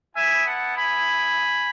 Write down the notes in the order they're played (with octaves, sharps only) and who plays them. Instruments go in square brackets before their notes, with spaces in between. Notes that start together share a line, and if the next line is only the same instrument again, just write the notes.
[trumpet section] B3 E4 E5 G#5
F#5 A5
G#5 B5